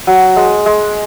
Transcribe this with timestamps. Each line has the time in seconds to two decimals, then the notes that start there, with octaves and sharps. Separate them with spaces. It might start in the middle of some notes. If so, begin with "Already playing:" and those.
0.07 F#3
0.36 G#3
0.66 G#3